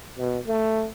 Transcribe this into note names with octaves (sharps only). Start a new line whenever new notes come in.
B2
A3